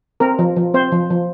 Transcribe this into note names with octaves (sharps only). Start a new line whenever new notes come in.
C4 A#4
F3
F3
C4 C5
F3
F3